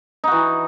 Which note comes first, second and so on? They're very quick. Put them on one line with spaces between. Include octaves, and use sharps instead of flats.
D#4 F#4 E3